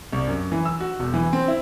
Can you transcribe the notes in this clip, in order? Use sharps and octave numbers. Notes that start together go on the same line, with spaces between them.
C2
F#2
E3
E6
F#4
E1
E3
C4
E4